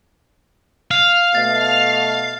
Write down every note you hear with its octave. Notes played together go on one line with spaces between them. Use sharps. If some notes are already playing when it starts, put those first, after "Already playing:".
F5 F6
B2 A3 D#5 A6